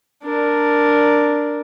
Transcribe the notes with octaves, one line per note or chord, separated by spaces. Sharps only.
D4 A#4